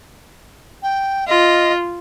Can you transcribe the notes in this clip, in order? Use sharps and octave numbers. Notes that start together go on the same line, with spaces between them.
G5
F4 D#5